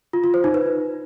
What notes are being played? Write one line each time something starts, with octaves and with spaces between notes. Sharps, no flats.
F4
F4
C5
D#4
B4